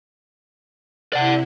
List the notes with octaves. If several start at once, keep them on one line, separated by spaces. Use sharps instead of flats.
C3 E4 D5 F#5